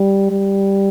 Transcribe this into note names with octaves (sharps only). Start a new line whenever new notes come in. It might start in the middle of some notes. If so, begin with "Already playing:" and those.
Already playing: G3
G3